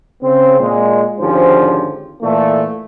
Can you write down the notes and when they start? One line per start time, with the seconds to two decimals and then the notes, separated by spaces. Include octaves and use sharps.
0.22 C#3 C4
0.59 A#2 G#3
1.19 G#1 D3 F3 C#4 G4 C5
2.22 A#2 E3 A3